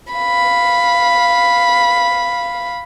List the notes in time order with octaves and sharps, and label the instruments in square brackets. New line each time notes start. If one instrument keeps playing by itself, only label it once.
[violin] F5 B5